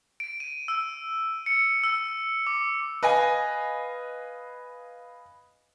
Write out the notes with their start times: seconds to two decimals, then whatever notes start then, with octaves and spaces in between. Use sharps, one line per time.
0.20 D7
0.40 D#7
0.68 E6
1.46 C#7
1.84 E6
2.47 D6
3.03 B4 D#5 F5 G#5